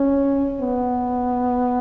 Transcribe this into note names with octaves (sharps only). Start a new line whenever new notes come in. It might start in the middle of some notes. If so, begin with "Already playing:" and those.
Already playing: C#4
B3